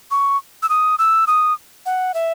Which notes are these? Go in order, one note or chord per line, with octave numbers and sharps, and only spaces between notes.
C#6
E6
D#6
E6
D#6
F#5
E5